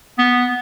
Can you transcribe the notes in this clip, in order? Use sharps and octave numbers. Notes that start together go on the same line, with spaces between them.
B3